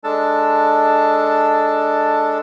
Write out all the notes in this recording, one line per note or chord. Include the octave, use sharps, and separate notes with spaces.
G#3 D4 A4 A5